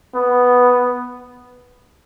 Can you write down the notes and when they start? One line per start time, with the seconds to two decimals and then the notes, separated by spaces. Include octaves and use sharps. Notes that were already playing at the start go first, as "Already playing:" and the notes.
0.15 B3